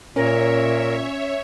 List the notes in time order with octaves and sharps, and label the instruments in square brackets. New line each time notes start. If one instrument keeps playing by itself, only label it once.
[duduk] A#2 [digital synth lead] C#4 [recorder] A#4 [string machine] C#5 E5